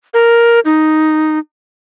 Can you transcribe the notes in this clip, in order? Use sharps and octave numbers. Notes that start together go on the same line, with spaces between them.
A#4
D#4